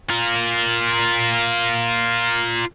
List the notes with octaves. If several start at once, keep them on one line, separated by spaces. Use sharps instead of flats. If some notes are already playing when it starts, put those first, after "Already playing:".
F4 A#4